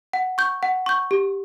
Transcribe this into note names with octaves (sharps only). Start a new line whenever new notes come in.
F#5
C#6 G6
F#5
C#6 G6
G4